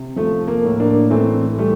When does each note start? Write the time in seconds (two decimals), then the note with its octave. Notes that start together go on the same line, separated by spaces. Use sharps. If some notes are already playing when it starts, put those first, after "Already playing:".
Already playing: C3
0.16 F3 A3
0.47 A#3
0.64 A2
0.80 A#3 D4
1.10 E3 A3 C4
1.58 G3 A3